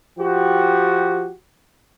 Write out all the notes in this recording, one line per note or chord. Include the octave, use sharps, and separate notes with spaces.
F3 F#4 G4